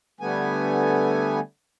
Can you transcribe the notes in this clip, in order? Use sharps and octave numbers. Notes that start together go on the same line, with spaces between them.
D3 G3 A3 B3 G#5